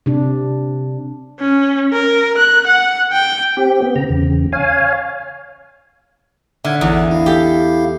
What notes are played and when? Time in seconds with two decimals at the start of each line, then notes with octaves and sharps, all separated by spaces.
0.06 C3 D4
1.40 C#4
1.93 A#4
2.37 F#6
2.67 F#5
3.12 G5
3.57 C4 G4
3.82 B3
3.96 C#3 A#5
4.09 E2 C#3
4.53 C#5 F5 G#5
6.64 D3 E5 F6 G#6
6.81 A1 E2
7.11 E4 F5
7.26 G4 A4